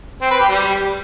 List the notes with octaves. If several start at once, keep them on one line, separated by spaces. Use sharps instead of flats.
C4
B4
G4
G3